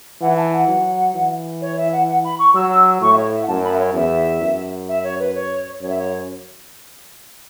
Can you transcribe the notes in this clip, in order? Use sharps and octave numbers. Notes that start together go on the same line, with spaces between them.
E3 F#5
F#5
A5
F#5
F#3
E3
C#5
E5
F#5
F#5
B5
C#6
F#3 E6
A2 C#6
E5
C#5
E5
F#5
F#2 A5
B5
E5
C#5
E2 E5
F#2
E5
C#5
B4
C#5
F#2 C#5
E5
C#5